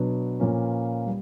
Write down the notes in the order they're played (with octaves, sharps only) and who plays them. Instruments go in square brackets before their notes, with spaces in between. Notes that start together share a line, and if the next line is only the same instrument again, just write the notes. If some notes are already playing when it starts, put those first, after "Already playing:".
Already playing: [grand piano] B2 F#3 B3 D4 B4
A#2 F3 A#3 C#4
G3